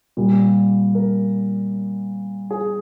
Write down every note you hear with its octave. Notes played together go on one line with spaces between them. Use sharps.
A#2 G3 A#3
A#4
G#4